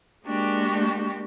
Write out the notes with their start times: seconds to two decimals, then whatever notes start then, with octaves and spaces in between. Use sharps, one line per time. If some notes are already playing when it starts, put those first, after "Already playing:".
0.24 G#3 A#3 D4 F#4 G4